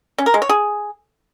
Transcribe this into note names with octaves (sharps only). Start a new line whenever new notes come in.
C#4
A#4
G#3
C#5
G#4